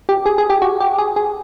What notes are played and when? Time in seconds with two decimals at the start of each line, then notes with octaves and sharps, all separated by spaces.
0.09 G4
0.26 G#4
0.38 G#4
0.50 G4
0.62 F#4
0.80 G4
0.98 G#4
1.16 G#4